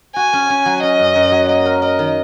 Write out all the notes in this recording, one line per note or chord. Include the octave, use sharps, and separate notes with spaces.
F#4 G#5
C#4
C#4
F#3
C#4 D#5
F#2
F#2
F#3
A#3 D#5
A#4
A#4 D#5
D#3